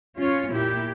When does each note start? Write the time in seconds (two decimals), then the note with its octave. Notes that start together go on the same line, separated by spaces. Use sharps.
0.18 C#4 F4 C#5
0.50 A#2 E4 G4